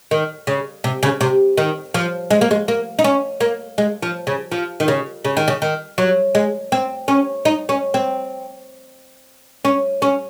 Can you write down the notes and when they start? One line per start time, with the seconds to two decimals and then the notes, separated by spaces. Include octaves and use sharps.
0.11 D#3
0.47 C#3
0.84 C3
1.03 C#3
1.21 C3
1.57 D#3
1.94 F3
2.31 G#3
2.41 A#3
2.51 G#3
2.68 A#3
2.99 D#4
3.04 C#4
3.40 A#3
3.78 G#3
4.02 F3
4.27 C#3
4.52 F3
4.80 D#3
4.88 C#3
5.25 C#3
5.37 D#3
5.48 C#3
5.62 D#3
5.98 F#3
6.35 G#3
6.72 C4
7.08 C#4
7.45 D#4
7.69 C#4
7.94 C4
9.65 C#4
10.02 C#4